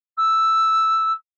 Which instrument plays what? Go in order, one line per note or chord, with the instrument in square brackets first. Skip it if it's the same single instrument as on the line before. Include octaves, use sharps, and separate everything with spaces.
[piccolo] E6